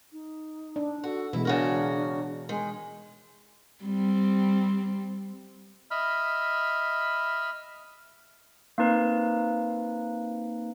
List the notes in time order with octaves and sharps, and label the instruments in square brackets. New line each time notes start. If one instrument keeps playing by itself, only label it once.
[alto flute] D#4
[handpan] D4
[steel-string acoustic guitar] F#4 [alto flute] A4
[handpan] B2 E3 G#3 [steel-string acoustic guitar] E4
[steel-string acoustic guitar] C#3 F#4 A#4 [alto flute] D4
[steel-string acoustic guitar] D#3 [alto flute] G#3
[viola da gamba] G3 C4
[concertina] D#5 E5 B5 F6
[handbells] A#3 C4 D#4 B4